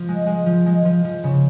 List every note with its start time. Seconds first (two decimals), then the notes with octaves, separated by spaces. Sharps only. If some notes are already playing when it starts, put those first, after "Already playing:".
Already playing: F3
0.09 G#3
0.27 G#3
0.46 F3
0.66 G#3
0.85 F3
1.04 F3
1.24 C#3